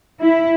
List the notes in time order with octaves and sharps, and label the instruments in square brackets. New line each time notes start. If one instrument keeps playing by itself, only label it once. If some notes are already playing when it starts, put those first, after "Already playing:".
[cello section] E4